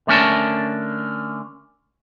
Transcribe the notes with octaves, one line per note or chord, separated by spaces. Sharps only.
D3 A3 C#4 A#4 A5